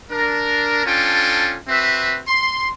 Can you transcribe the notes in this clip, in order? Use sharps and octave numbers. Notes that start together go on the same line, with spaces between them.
D4 A#4
C#4 D4 F4 A4 G5
C4 F#4 B4 E5
C6